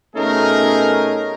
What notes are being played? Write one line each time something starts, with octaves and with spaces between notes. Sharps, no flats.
B2 A3 C#4 D#4 G#4 A#4